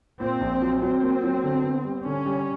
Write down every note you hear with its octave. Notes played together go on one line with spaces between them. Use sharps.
A#2 C4
A#1
F#3
F#3 C4
A#3
F#3
D3
B3
G3
D3 C#4
G3